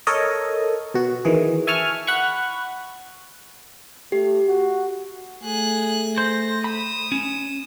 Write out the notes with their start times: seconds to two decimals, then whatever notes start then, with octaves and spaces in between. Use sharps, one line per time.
0.07 A4 A#4 C#5 D#5
0.94 B2 F#4
1.25 D#3 E3 G#4
1.67 E5 G#5 A5 C#6 F6
2.07 F#5 B5 C#6
4.12 A3 G4
4.48 F#4
5.43 A3 G#4 F#6
6.18 C5 A#6
6.64 B5 D#6 E7
7.12 C#4